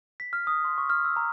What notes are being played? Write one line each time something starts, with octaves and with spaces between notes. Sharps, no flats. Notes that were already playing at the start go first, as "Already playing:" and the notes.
B6
F6
D#6
C6
C#6
F6
E6
A#5